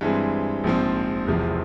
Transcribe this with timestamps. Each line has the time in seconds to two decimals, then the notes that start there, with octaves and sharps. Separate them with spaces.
0.01 G2 E3 G#3 C4
0.64 A#1 G#2 F3 C4
1.27 E1 E2 C3 F3 C4